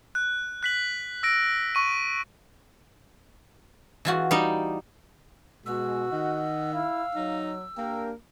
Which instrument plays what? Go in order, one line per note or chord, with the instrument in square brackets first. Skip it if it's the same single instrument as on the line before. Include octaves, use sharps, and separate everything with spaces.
[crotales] F#6
F#6 B6 F#7
E6 A#6 D7
C#6 D#7
[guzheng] E3 F4 F#4
[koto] G3 D#4
[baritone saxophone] B2 [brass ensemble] G#3 [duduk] F#4 [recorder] E6
[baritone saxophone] D#3 [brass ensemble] D#5 F#5
[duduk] E4 [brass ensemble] F5
[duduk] F#3 [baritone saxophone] D#4
[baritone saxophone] A#3 [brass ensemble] D4 G4 G5 [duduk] A#4